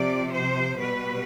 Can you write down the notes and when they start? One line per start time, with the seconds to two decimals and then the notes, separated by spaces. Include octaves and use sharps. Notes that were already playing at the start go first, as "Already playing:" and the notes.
Already playing: C3 F3 D5
0.33 C5
0.78 B2 G3 B4